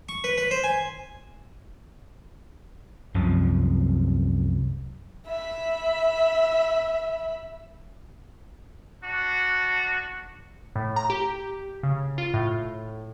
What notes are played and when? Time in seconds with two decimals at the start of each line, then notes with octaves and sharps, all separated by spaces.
0.09 C#6
0.24 B4
0.38 B4
0.51 C5
0.64 G#5
3.14 C2 F#2 C3 F3
5.27 E5 B5
9.04 D4 F#4
10.76 A2
10.96 A#5
11.10 G4
11.83 C#3
12.18 F4
12.34 A2